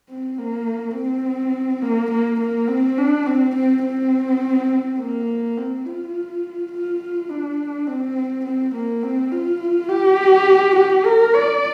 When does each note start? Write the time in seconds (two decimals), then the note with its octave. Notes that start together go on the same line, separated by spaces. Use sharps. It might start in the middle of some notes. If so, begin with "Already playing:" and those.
0.09 C4
0.38 A#3
0.95 C4
1.82 A#3
2.11 A#3
2.40 A#3
2.68 C4
2.98 D4
3.26 C4
3.55 C4
3.84 C4
5.00 A#3
5.58 C4
5.86 F4
6.73 F4
7.30 D4
7.87 C4
8.45 C4
8.74 A#3
9.03 C4
9.32 F4
9.89 G4
10.76 G4
11.05 A#4
11.34 D5